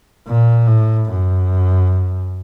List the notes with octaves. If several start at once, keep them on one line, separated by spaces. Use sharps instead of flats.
A#2
A2
F#2